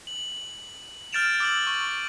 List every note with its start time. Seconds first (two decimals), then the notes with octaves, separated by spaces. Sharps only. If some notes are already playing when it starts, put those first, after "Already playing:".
0.07 F#7
1.12 F6 G6 A6 D7 E7 F7
1.40 D6 E6 A6 F#7
1.67 C#6